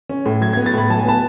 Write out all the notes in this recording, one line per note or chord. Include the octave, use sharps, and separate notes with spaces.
C#4
A2
F#3 G#6
B3 G#6
A6
A2 B5
F#3 A5
G#5
B3 A5